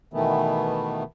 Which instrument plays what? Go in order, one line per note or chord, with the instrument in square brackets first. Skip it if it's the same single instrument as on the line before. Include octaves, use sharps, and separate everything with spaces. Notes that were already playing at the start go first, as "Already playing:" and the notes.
[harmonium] B2 D#3 E3 A3 B3